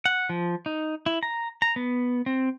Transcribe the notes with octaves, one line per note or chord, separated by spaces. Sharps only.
F#5
F3
D#4
E4
A#5
A#5
B3
C4